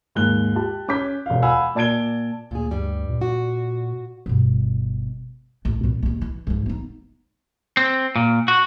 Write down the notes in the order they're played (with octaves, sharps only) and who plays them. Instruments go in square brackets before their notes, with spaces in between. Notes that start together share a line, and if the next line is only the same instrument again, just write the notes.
[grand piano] D#2 G#2 F#6 G7
G4 A5
C#4 D6 G6 B6
E1 F5
F5 F#5 G#5 B5 E6
A#2 D5 A5 G#6 D7 G7
[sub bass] D2 [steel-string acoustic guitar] A#2 G#4
[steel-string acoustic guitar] G2 G3
[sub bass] A#2
[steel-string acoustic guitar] F#4
[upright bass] G1 B2
A1
A#2 B3
A#1 D#2
E3
G#2 F3
B3 D#4
[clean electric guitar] C4
A#2
F#4